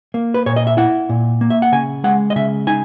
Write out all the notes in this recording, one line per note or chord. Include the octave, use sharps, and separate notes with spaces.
A#3
B4
A#2 C#5
D#5
E5
E4 F#5
A#2
A#3
E5
F#5
C#3 G#5
G#3 F#5
D#5
C#3 E5
D#4 G#5